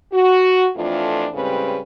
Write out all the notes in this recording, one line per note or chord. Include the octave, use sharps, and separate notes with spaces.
F#4
F2 E3 A3 D4 F4
A2 C#3 G3 G#3 C4 B4